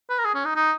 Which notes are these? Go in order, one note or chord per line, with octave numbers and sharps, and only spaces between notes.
B4
A#4
G#4
C#4
D#4
D#4